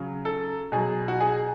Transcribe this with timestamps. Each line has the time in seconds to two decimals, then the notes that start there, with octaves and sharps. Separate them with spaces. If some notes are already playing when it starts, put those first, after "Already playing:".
Already playing: C#3 F#3
0.25 A4
0.72 B2 F#3 G#4
1.08 F#4
1.20 G#4